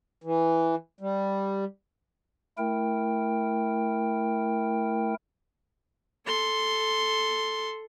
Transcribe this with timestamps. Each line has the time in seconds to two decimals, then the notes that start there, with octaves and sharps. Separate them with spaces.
0.24 E3
1.01 G3
2.58 A3 E4 A#4 G5
6.25 A4 C6